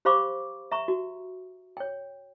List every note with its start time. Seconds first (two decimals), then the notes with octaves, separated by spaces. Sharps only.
0.05 G4 C5 F5 B5 C#6 D6
0.72 E5 A#5 C#6
0.88 F#4
1.77 C#5 G5